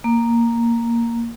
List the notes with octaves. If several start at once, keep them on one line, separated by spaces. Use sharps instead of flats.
A#3